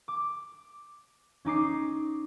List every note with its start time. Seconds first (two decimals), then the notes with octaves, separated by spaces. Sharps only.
0.08 D6
1.45 C#4 D#4 D6 C7